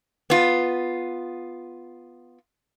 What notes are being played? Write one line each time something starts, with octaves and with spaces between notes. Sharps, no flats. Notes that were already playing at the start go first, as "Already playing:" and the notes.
B3 F4